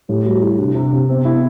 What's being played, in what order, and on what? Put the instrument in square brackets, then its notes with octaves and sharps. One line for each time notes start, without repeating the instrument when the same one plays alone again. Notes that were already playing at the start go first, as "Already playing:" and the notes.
[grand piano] A2 [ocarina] G4
[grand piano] G3 [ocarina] F#4
[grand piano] G3 [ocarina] E4
[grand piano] C3 [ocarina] D4
[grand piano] C3
C3
[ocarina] B3 [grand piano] C4
[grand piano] E4